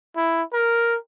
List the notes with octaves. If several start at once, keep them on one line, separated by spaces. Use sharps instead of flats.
E4
A#4